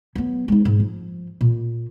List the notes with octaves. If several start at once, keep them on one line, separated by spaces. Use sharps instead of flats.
F#3 B3
G#3 D#4
G#2
F3
A#2